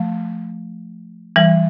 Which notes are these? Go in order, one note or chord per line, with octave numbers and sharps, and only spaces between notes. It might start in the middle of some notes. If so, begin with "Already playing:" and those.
Already playing: F3 A3
E3 G3